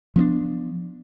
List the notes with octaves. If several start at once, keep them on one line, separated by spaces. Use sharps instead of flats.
F3 B3 C4 D4